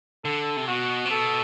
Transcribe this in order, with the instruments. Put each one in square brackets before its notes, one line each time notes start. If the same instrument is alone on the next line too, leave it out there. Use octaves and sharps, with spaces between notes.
[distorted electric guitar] D3 [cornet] A4
[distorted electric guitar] C3
[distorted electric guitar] B2 [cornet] F#4
[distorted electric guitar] C3
[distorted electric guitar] B2 [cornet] A4